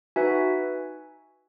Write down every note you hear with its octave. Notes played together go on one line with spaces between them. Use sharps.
D#4 F#4 B4 E5 G#5